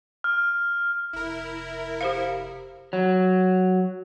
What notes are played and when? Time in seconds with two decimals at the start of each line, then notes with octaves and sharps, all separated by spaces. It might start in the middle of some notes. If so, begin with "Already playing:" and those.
0.24 F6
1.13 F1 E4 A#4
2.01 G4 C5 F5
2.93 F#3